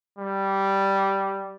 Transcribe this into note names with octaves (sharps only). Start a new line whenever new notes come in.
G3